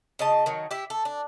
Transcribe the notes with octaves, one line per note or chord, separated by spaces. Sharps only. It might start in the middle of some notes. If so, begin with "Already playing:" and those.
C#3 D#5 A5
D#3 F#3
E4 G4
A4
D4